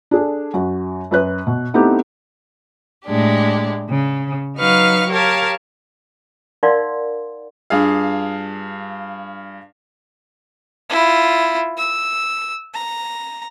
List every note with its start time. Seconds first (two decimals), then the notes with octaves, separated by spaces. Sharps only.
0.11 D4 G#4 A4
0.54 F#2 F#4
1.11 F#2 B4 F#6
1.47 B2
1.74 A3 B3 C4 D#4 E4 G4
3.05 A2 G#3 D4 G4
3.89 C#3
4.57 F#3 D#4 B4 F5 C#6 F6
5.09 G4 A#4 C#5 F5 A5
6.63 D#4 A#4 D5 F5 F#5 C6
7.70 G2 F4 G#4 F5
10.89 E4 F4
11.77 E6
12.74 A#5